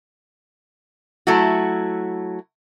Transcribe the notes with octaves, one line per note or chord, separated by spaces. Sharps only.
F#3 A3 E4 F#4